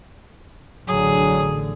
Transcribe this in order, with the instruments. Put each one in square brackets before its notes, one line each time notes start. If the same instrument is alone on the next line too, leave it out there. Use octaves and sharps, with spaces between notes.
[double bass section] A1 D3 [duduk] F#3 [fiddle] G#4